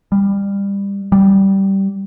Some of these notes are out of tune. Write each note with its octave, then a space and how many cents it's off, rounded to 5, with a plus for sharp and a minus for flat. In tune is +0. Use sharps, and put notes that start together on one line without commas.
G3 +25
G3 -15